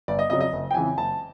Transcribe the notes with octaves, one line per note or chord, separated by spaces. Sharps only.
G1 D5
D#5
F2 C#3 F#3 D#5
D#5
F#1
G5
F2 C#3 E3 G#3 G#5
F#1 A5